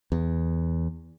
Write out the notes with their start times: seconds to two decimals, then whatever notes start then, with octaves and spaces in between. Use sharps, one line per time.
0.12 E2